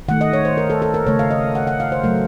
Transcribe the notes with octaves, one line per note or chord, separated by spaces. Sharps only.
D#3 A3 F#5
D#5
C#5
C5
A#4
A4
A4
A#4
C#3 A3 C#5
F5
D#5
F#5
F#5
F5
C5
C#3 F#3 A3 A#4